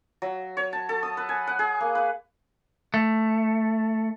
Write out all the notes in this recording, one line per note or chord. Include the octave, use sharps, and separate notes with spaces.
F#3
C#5
A5
A4
D#6
B4
G#5
F#5
G#4
A#3
B4
A3